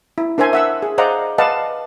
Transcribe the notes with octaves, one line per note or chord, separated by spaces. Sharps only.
E4
D4 A#4 C5 E5 G#5 C6
E5 F#5 E6
G#4
C5 D5 D#5 F5 F#5 A#5
B4 D5 D#5 F5 F#5 A5